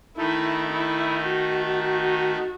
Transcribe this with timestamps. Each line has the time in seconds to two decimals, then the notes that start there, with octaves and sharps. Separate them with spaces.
0.17 D#3 A3 D#4 E4
0.72 E4
1.28 F#4